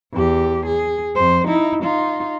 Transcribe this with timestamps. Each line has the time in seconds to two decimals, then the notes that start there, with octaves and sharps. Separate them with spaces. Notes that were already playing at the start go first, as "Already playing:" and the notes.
0.13 E2 G4
0.66 G#4
1.15 F2 C5
1.47 D#4 E4
1.83 D#4 F4